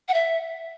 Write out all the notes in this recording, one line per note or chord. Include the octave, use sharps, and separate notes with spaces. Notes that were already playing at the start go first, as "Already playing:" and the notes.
F#5
E5